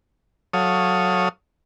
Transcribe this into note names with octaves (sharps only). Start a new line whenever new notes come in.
F#3 A4 C#5 F5 D#6